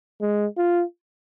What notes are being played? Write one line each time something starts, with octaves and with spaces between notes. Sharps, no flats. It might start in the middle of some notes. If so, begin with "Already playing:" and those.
G#3
F4